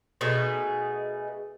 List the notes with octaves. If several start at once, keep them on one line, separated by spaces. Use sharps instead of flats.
B2 A3 D#4 G#4